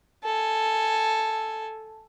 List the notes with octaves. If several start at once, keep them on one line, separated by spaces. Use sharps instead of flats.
A4 G#5